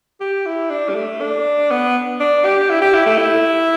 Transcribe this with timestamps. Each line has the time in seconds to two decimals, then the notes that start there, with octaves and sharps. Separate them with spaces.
0.21 G4
0.46 E4
0.70 D4
0.89 G3
0.95 A3
1.21 D4
1.70 B3
2.20 D4
2.44 G4
2.69 E4
2.82 G4
2.94 E4
3.06 A3
3.18 E4